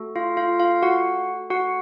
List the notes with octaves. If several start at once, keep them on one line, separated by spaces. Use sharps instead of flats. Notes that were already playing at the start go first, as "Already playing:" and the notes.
Already playing: A3 F#4 A4
F4 F5
F4 F5
F4 F5
F#4 F#5
F#4 F#5